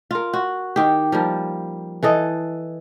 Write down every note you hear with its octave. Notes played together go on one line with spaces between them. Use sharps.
F4 A#4
F#4
D#3 G4
F3 G3 A#3
E3 A4 D#5